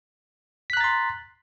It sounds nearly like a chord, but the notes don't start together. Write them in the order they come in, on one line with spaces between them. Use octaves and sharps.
B6 F#6 A#5 A6 C6